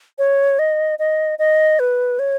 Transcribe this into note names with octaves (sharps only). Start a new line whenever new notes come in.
C#5
D#5
D#5
D#5
B4
C#5